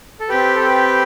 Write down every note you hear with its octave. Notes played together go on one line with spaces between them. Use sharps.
A4
C4 G4 B4
A4
B4